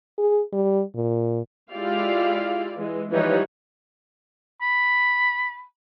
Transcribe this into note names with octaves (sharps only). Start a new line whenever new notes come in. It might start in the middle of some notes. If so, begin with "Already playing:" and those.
G#4
G3
A#2
G#3 E4 F4 G4 D5 F5
E3 G#3
E3 F3 G3 D#4 C#5 F#5
B5